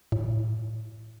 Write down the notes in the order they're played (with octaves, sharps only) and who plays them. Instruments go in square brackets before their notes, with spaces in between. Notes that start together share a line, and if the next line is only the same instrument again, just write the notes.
[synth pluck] A2